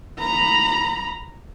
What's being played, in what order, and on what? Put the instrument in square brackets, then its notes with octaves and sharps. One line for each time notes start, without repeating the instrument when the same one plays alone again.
[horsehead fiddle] A#5 B5